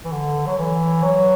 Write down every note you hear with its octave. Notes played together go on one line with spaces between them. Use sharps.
E3
D3
F#3
E3
F#3